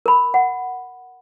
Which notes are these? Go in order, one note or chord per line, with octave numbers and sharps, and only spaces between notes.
A#4 B5
F#5